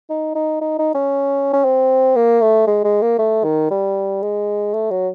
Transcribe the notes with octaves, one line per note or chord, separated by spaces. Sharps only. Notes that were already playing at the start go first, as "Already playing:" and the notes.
D#4
D#4
D#4
D#4
C#4
C#4
C4
A#3
A3
G#3
G#3
A#3
A3
D#3
G3
G#3
A3
F#3